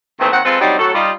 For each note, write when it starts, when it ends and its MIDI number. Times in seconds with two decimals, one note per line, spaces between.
0.20 0.30 39
0.20 0.30 51
0.20 0.30 52
0.20 0.30 57
0.20 0.30 60
0.32 0.40 39
0.32 0.40 51
0.32 0.40 60
0.32 0.40 78
0.45 0.56 56
0.45 0.56 60
0.45 0.56 65
0.45 0.56 69
0.45 0.56 71
0.59 0.77 54
0.59 0.77 55
0.59 0.77 60
0.59 0.77 62
0.59 0.77 63
0.59 0.77 67
0.78 0.90 45
0.78 0.90 54
0.78 0.90 66
0.78 0.90 69
0.94 1.11 55
0.94 1.11 63
0.94 1.11 65